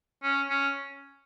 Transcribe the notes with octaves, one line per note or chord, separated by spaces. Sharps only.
C#4
C#4